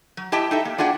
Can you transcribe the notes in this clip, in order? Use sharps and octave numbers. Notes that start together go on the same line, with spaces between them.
F#3
E4 G4 D#5 G5 A5
D#4 A4 E5
A#3
D4 F4 G#4 F#5 G5